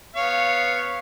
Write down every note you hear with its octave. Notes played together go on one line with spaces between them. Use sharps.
B3 C#5 F5